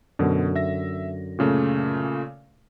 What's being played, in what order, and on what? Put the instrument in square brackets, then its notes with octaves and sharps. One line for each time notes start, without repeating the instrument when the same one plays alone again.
[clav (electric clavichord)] F#2 D3 [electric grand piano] B2
[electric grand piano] E5 A#6
A#2 C#3 A3